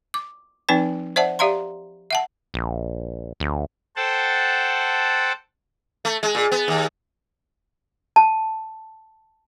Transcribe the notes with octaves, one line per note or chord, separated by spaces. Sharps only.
D6
F3 C4 D#4 B4 G5
C5 D5 E5 F#5 A5
G4 D5 E5 F5 A#5 C6
E5 F#5 A5
A#1
D2
A4 C5 F#5 G5 A5
A3
G#3
A#2
B3
D#2
A5